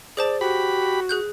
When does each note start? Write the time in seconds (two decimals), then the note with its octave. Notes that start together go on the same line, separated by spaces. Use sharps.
0.17 G#4 C5 D5 A5
0.41 F#4 G4 B5
1.09 G#4 F#6 G6